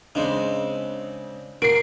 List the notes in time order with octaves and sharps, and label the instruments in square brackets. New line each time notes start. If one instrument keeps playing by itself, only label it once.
[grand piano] C#3 C4 [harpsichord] G#3 D4 D#4
[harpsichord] F#4 [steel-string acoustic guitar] A#4 [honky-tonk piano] C7 D7